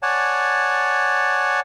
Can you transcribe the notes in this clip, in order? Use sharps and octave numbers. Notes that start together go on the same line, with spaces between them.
C#5 D5 F#5 G#5 A5